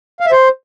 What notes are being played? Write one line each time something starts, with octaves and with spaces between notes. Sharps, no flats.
F5
E5
C5